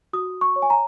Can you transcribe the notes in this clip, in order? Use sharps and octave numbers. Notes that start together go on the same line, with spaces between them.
F#4 D#6
C#6
C#5
G#5
A#5